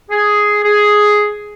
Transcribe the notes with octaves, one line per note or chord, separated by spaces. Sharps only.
G#4
G#4